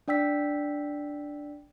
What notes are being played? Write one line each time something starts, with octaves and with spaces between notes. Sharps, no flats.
D4 D5 G5 E6 B6